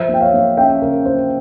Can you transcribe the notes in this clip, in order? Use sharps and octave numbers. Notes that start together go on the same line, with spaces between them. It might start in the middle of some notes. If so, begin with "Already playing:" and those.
Already playing: F3 C5 E5
A#3
G5
C#5 F5
A#3
C#4 E5 G5
C#3 A#4
A#3 C5